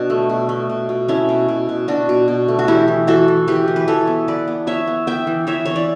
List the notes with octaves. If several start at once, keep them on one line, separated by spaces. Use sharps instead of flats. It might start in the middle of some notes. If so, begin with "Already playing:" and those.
Already playing: B2 D4
A3
B2
A3
B2
B2
A3 C#4 E4
B2
B2
B2
B2 D4 F#4
B2
B2
A3
F#4
E3 E4 G4
E3
E3 F#4 A4
E3
E3 G4 B4
E3
B4
E3 A4 C#5
B3
B3 B4 D5
B3
B3 C#5 E5
B3
B3 E5 G5
E3
E3 C#5 E5
E3 C#5
D5